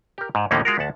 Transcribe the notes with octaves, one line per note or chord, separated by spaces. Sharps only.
G4 A#4
G#2
D#2 A2 D3 F3 A#3 C#4
G#3 F4 F#4 A#4
D2 F#5 A5